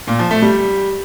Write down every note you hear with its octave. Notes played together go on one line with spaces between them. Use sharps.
A#2
F3
A3
G3